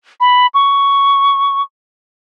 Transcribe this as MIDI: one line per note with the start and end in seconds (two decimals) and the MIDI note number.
0.20 0.47 83
0.54 1.62 85